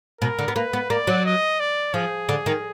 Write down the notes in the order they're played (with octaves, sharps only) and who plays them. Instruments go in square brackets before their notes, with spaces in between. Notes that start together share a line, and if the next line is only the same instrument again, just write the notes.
[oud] B2 [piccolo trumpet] A#4
[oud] D3
B3
[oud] A#3 [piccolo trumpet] B4
[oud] B3
[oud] A#3 [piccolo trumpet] D5
[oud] F#3
[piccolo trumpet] D#5
D5
[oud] F3 [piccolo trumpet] G#4
[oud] D3
D#3